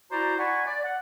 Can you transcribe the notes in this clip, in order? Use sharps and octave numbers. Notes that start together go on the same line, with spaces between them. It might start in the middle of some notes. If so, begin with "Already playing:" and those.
E4 F#4 C5 D5 A#5
D5 F#5 G#5 B5 C#6
D5
F#5